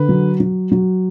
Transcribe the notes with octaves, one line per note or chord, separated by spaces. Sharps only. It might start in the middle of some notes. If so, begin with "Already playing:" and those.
Already playing: D3 B4
F#3
F#3
F#3